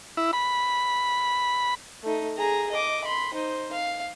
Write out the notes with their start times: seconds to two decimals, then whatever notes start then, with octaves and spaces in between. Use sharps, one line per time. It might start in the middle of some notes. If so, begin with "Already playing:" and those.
0.17 E4
0.33 B5
2.03 A3 D#4
2.37 G#4 A#5
2.71 D#5 D6
3.04 B5 C6
3.34 D#4 C5
3.72 F5